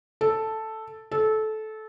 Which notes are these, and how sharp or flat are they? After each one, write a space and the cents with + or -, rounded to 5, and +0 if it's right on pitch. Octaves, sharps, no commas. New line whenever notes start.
A4 +0
A4 -20